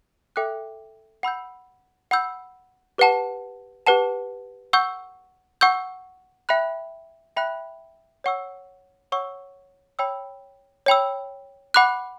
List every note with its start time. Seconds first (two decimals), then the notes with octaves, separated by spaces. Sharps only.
0.36 A4 E5 G5 D6 F#6
1.23 F#5 B5 E6 G6
2.11 F#5 B5 E6 G6
2.98 G4 B4 F#5 A5
3.87 G4 B4 F#5 A5
4.73 F#5 C#6 E6 G6
5.61 F#5 C#6 E6 G6
6.49 E5 G5 B5 F#6
7.36 E5 G5 B5 F#6
8.24 C#5 F#5 C#6 E6
9.12 C#5 F#5 C#6 E6
9.99 C#5 G5 B5 E6
10.86 C#5 G5 B5 E6
11.74 F#5 B5 D6 F#6